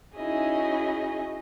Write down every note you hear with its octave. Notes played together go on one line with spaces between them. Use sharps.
C#4 D#4 E4 F#4 G#4 D#5